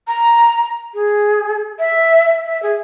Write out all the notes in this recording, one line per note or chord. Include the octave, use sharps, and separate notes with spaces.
A#5
G#4
E5
E5
G#4